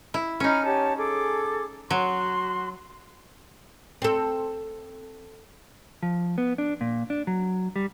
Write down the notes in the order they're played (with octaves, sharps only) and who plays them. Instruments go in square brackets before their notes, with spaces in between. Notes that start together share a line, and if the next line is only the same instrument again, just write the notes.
[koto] E4
[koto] C#4 D#4 [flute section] A#5 B5 F6
[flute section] G4 C#5 A5
G#4 A4 D6
[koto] F#3 [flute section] F#4 C6
[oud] C4 A4
[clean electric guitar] F3
B3
D4
A#2
D4
F#3
G3